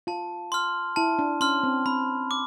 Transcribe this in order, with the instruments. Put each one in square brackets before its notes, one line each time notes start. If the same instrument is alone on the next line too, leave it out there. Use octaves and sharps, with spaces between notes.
[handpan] F4 [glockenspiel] A5
[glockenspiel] C6 F6
[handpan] E4 [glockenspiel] A5
[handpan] D4
[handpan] C#4 [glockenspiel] C6 F6
[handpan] C4
[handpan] C4 [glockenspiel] B5
[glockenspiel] D6